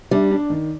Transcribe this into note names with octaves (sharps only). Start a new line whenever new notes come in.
G3 D4
D4
D#3